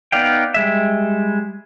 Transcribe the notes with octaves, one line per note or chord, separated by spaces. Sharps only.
B3 D#4 D5 F5 G5
G3 G#3 E5